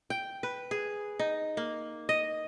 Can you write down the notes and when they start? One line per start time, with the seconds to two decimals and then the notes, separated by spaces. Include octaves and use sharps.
0.10 G5
0.43 B4
0.71 G#4
1.19 D#4
1.57 A#3
2.09 D#5